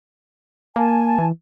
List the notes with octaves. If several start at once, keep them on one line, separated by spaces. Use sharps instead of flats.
A#3 G#5 A5
E3